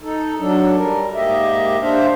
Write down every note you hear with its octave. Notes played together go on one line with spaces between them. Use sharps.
D#4 A4
F#3 D4 A4
G3 A#4
G#2 A#3 G4 D#5 E5
D4 C5 E5 F5